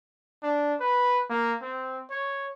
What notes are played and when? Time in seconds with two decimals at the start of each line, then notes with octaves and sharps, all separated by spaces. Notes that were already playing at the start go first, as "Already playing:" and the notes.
0.43 D4
0.80 B4
1.29 A#3
1.61 C4
2.10 C#5